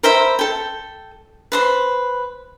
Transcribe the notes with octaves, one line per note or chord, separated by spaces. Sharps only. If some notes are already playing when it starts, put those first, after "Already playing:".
A#4 C5 E5 B5
A4 G5
B4 C5 C6